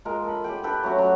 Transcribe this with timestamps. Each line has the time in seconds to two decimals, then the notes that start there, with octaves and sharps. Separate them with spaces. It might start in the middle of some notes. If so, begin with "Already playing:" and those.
0.05 G#3 F4 A#4
0.25 A4 B5
0.44 G4 G#4 G5
0.63 G4 A4 B4 G5
0.83 F#3 A3 C#4 F#4
0.98 F#3